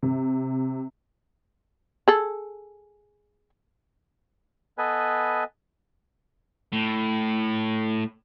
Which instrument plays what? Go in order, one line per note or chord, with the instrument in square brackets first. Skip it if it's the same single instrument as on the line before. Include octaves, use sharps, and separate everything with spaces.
[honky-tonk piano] C3
[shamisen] G#4 A4
[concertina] B3 A4 B4 D#5 G#5
[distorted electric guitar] A2